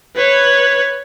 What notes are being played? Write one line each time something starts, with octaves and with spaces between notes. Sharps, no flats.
B4 C#5